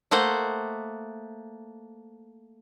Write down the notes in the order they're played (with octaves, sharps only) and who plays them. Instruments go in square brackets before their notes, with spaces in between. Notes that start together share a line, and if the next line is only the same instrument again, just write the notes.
[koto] A3 A#3 C5 D#5 F#5